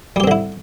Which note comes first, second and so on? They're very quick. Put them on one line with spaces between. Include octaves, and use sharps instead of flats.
G3 G4 C4 D3 E4